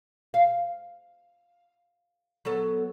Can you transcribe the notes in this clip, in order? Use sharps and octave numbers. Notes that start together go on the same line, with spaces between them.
F5
F#3 B3 A4